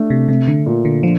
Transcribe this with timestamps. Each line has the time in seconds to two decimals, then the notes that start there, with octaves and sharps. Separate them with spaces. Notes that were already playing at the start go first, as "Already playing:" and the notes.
Already playing: A3 D4
0.10 C3
0.28 C3 A3
0.48 D3
0.66 A#2
0.85 D3
1.03 D3 F3